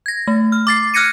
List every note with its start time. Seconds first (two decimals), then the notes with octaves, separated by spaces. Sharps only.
0.06 G#6 A#6
0.27 A3
0.52 F6
0.67 D6 A6 C7
0.94 F6 F#6 G#6 A#6 C#7 D#7